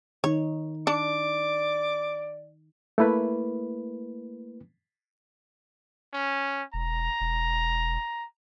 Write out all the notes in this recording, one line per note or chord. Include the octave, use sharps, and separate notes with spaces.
D#3 D#4 C#5
D4 D5 D6
A3 A#3 E4 B4
C#4
E1 A#5
E1